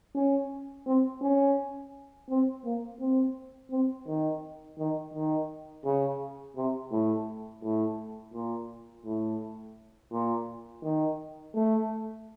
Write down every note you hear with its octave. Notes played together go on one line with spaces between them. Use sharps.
C#4
C4
C#4
C4
A#3
C4
C4
D#3
D#3
D#3
C#3
C3
A2
A2
A#2
A2
A#2
D#3
A3